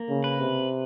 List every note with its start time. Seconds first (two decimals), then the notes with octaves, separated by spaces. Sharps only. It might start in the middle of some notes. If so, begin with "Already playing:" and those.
Already playing: A#3
0.09 C#3
0.24 B4
0.40 C3